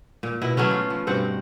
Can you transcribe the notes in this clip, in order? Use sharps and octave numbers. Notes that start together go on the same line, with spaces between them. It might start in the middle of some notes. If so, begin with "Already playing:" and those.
A#2
B2 E4
F#3 A3 B3 C#4
F4
F3
G2 B2 C4 F#5